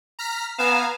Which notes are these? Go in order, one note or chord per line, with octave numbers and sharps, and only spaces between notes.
A#5 F6 B6
B3 F5 G#5 A#5 E7